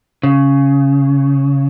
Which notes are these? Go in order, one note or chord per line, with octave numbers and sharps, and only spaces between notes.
C#3